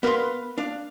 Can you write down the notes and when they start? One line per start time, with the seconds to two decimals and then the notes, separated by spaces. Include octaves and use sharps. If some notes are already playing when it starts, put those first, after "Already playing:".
0.03 B3 A#4 B4 F5 C6
0.58 D4 F5